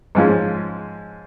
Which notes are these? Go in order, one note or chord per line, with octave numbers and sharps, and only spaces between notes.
G#2 F3 G#3 C#4